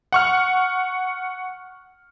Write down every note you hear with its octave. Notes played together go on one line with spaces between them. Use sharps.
F#5 C#6 F6